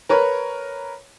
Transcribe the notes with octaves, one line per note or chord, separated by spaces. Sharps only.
A#4 B4 C#5